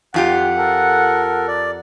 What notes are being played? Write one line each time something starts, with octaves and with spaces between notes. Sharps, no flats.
F2 F4 G4 F#5
A4 A#4
D5